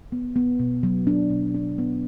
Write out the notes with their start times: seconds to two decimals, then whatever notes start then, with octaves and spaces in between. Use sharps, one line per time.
0.12 B3
0.36 B3
0.59 B2
0.83 F#3
1.07 D4
1.30 B2
1.55 D4
1.78 B3